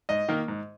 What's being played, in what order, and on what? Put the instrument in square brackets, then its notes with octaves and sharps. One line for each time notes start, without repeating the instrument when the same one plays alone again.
[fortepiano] G#2 D#5
D#3 A#3
G#2